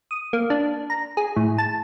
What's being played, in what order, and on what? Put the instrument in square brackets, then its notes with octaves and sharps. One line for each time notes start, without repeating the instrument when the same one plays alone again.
[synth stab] D#6
A#3
D4
A#5
G#4
A2
A5